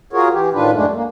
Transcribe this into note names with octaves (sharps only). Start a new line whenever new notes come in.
F4 F#4 G#4 A#4 C#5
E3 G4
A2 D#3 D4 F4 B4
F#2 D3 G#3 A3 D4
A#3